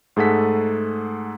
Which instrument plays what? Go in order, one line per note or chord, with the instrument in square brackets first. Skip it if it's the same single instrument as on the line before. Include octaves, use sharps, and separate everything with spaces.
[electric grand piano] G#2 A3 G#4 A4 F#5 B6